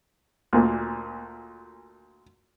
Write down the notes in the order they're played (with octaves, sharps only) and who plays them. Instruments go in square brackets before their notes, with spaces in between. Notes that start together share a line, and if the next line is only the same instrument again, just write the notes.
[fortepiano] D2 A#2